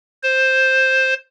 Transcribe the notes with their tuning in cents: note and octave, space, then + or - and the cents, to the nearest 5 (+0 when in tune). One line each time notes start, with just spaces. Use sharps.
C5 +5